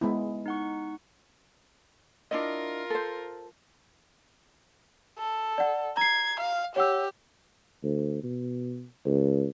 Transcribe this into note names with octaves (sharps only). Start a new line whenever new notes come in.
G#3 B3 E4
D#4 F#5 C#6
D4 E4 F4 A#4 D#5
A4 C5
A4
D5 F#5
A#5 G#6 C7
F5
G4 C#5 F#5 E6
D2
B2
C#2